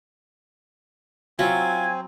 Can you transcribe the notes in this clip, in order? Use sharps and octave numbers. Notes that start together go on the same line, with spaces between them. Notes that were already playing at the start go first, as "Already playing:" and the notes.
F#3 C4 E4 F4 G#5